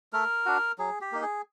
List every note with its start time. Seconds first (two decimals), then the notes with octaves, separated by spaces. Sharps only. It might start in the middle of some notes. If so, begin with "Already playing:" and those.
0.13 A3 A#4
0.46 D4 F#4
0.78 F#3 G#4
1.01 G4
1.12 A#3 D#4
1.22 G#4